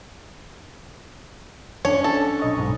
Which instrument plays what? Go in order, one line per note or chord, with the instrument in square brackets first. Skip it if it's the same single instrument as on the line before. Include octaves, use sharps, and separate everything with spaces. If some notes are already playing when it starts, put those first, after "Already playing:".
[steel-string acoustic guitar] C#4 [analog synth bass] D4 [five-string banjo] C#5
[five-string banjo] A4
[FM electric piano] B1 D#5 C#6
[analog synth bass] G#2